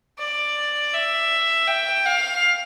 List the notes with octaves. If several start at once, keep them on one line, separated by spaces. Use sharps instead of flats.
D5
E5
G5
F5